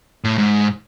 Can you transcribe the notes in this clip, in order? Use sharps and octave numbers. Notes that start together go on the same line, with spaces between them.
A2
G#2